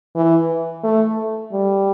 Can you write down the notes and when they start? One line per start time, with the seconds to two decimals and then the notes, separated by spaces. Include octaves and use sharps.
0.16 E3
0.83 A3
1.52 G3